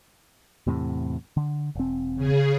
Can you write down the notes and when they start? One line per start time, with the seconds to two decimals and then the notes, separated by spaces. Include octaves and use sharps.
0.67 E2 A2 C3
1.37 D3
1.75 E1 C4
2.16 C#3 G#4